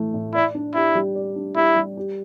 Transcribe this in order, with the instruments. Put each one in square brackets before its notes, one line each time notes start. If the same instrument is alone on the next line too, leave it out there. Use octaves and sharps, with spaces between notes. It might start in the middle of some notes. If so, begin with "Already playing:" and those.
Already playing: [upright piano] A2 E3 A3
A2
[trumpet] E4 [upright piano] D5
[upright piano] D4
[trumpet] E4 [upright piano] G4
[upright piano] G3
D5
D4
[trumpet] E4 [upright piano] G4
[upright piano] G3
G4